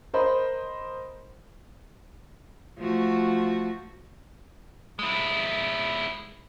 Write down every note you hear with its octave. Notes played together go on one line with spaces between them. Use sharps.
A#4 C5 D#5 B5
F3 A3 F#4
G#3 E4